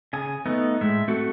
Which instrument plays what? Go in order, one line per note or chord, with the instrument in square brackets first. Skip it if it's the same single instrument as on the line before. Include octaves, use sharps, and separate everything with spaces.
[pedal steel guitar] C#3 G#5 D#6
[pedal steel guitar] A3 D#4 [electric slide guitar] B3
[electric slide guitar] A2 G#3 [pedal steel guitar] E5
[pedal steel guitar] A3 [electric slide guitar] C4 F#4 A4